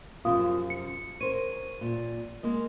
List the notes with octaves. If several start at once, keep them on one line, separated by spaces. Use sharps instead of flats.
F#2 C3 F3 F4 F5 D#6
C#7
A#4 C5 C#5 D#7
A#2
G#3 A#3 D#5